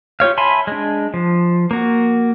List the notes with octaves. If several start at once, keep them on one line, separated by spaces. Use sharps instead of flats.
F4 G4 C#5 F5
E5 G#5 A5 B5 C6
G#3 D4
F3
A#3 F#4